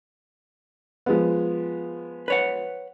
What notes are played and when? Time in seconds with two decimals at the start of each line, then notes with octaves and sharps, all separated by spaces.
1.06 F3 G#3 B3
2.28 B4 C#5 F#5